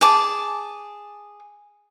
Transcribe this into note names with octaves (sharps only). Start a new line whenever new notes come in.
G#4 A5 D6